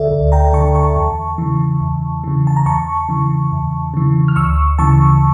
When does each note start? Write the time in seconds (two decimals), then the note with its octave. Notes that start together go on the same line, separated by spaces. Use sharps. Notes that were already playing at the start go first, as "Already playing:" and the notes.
Already playing: D2 D3 A4 D5 E5
0.11 D2
0.32 G5 A#5
0.53 D3 A5 C#6
0.75 A5 C#6
0.96 E2
1.38 C#3 E3
1.81 E2
2.24 C#3 E3
2.47 A5
2.56 A#5
2.66 E2 A5 C#6
3.09 C#3 E3
3.52 E2
3.94 C#3 E3
4.28 F6
4.36 D2 C#6 E6
4.79 C#3 E3 A5 C#6